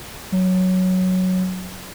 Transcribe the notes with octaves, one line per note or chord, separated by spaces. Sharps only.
F#3